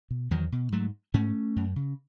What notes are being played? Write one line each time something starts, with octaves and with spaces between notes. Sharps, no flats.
B2
E2 D#3 F#3
B2
G#2 F#3 A3
G#2 A3 C#4
F#2
C#3